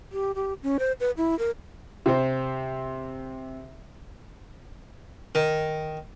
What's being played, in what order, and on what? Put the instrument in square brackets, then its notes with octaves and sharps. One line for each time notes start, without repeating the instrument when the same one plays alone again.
[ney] G4
G4
C#4
C5
B4
E4
A#4
[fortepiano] C3 C5
[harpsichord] D#3